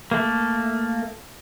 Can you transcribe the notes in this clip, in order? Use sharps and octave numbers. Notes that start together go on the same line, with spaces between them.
A3 A#3